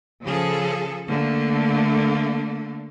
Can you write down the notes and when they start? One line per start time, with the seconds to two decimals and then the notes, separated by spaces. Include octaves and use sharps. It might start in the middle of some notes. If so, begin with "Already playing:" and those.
0.25 C#3 F3 G#4 A4
1.08 D3 A3 A#3